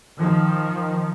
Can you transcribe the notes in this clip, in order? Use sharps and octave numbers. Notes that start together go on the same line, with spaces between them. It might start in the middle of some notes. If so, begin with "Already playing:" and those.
D#3 F3